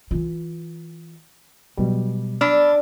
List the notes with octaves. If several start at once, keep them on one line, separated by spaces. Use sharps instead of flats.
E3 F4
B2 F#3 G3
D4 B5 E6 F6